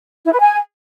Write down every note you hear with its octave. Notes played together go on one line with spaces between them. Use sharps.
E4
B4
G#5